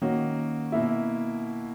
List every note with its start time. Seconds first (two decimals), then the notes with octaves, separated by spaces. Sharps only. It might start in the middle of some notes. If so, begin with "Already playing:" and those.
0.02 D#3 A#3 C#4 F#4
0.72 B2 A#3 E4